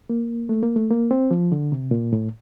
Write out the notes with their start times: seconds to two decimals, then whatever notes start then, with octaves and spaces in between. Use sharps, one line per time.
0.10 A#3
0.49 A3
0.63 A#3
0.76 A3
0.91 A#3
1.11 C4
1.31 F3
1.52 D3
1.72 C3
1.91 A#2
2.13 A2